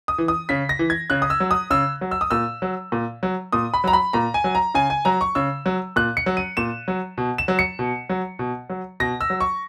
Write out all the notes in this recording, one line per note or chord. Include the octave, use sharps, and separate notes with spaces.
D#6
E3
D#6
C#3 B6
A#6
E3
G#6
C#3 F#6
D#6
E6
F#3
D#6
C#3 E6
F#3
E6
D#6
A#2 E6
F#3
A#2
F#3
A#2 D#6
B5
F#3 A#5
B5
A#2 A#5
G#5
F#3
A#5
C#3 G#5
G#5
F#3 A#5
C#6
C#3 E6
F#3
A#2 F#6
C#7
F#3
D#7
A#2 E7
F#3
B2
E7
F#3
C#7
B2
F#3
B2
F#3
B2 A#6
E6
F#3
C#6